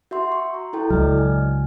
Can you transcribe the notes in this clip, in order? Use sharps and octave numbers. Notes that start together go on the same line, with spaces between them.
F#4 E5 C6
C#6
A#5
E4 A4 G5
C#2 F#3 D5 D#5 F6
G#5